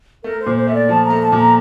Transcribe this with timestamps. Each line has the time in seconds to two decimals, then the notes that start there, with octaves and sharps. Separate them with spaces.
0.24 A3 A#4
0.40 C5
0.46 A#2
0.57 C5
0.67 A3 E5
0.73 D5
0.89 F3 A5
1.05 A#5
1.10 A3
1.21 A5
1.32 A#2
1.37 A#5